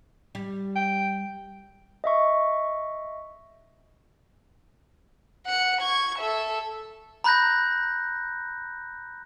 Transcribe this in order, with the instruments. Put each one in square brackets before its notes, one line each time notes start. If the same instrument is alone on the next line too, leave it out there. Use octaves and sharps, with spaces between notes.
[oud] G3
[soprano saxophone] G5
[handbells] D#5 E5 C#6
[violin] F#5 C#7
C#6 G#6
A4 E5
[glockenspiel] A#5 B5 F#6 G6 A#6